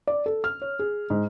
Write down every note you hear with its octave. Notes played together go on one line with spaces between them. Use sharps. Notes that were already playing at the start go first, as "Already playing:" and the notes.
D5
A4
F6
C#5
G#4
G#2